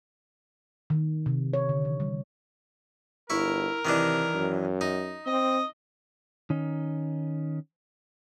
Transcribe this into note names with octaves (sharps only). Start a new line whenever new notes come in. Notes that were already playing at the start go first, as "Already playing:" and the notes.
D#3
C3
C#5
D3
E3
G3
G1 E4 A#4 C#6
C3 D#3 E3 D4
F#2
D#4
C4 D#5
D#3 C#4 D#4